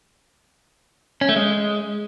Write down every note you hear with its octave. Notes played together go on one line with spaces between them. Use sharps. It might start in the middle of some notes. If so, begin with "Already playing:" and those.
C#4
A3
G#3